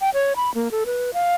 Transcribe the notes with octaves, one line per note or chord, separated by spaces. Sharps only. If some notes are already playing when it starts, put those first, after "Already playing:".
G5
C#5
B5
A#3
A4
B4
F5